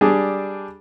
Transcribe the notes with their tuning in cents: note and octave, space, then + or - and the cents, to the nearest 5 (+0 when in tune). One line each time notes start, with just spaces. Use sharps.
G3 +0 D4 +0 G#4 +5